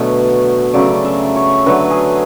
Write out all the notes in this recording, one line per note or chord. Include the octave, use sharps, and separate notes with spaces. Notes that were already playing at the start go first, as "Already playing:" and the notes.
Already playing: B2 D3 F#3 A3 C#5
C#3 F#3 A3 D5
E5
C#5
D3 F#3 A3 B4
G#4